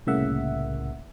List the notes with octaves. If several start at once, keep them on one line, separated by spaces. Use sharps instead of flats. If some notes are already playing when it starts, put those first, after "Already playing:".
C2 A2 C#3 A#3 E5 F#5